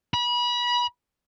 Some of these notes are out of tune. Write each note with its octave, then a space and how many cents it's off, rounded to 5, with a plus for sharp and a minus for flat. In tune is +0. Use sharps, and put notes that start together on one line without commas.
B5 -30